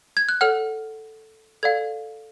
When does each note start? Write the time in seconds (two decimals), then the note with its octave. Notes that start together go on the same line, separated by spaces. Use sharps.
0.17 G#6
0.29 F#6
0.41 A4 C#5 F#5 F6
1.63 A4 D5 F5 G#6